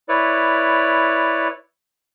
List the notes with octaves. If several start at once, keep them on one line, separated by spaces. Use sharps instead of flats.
E4 B4 C#5 D5